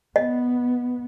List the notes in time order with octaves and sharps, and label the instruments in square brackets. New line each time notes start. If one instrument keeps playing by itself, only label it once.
[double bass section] B3 [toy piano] D#5